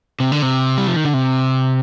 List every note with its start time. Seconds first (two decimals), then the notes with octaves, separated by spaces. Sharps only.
0.20 C3
0.32 D3
0.42 C3
0.78 G3
0.87 F3
0.96 D#3
1.05 D3
1.14 C3